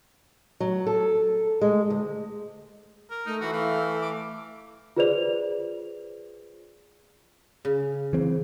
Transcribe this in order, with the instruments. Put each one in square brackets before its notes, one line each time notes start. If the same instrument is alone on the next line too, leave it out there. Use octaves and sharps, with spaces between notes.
[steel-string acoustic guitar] F#3
A4
G#3
D2
[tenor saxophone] A#4
[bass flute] A3 [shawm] D#4
[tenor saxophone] E3 [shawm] F#4
[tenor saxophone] E3 [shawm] F5
[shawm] D6
[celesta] F4 G#4 B4 C5 D5 F7
[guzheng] C#3
[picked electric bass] E3 C4